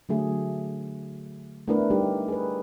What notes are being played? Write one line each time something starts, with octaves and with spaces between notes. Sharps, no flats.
D3 F#3 A3 G#4
A3 B3 D4 E4 A#4 B4
G3 D#4 G4 A#4
G#4 B4